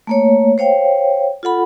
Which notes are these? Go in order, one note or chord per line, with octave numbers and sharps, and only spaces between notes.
A3 A#3 C#5
C5 C#5 F5 G5
F4 A4 F#5 B5